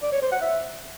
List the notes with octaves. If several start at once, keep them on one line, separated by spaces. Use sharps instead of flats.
D5
C#5
C5
F#5
E5